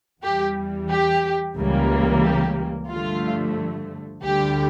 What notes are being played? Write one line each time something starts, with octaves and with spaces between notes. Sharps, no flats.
E2 E3 G3 G4
G4
C#2 C#3 E3 G3 A#3
G4
G2 D3 F3 A3 F4
D2 D3 G3 G4